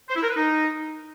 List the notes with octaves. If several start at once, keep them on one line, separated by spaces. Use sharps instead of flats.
C5
E4
A#4
B4
D#4